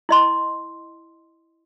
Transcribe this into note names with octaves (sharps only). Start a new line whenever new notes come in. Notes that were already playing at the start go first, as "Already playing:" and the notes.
E4 D#5 C6